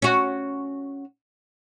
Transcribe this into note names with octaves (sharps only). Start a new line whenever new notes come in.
C#4 F#4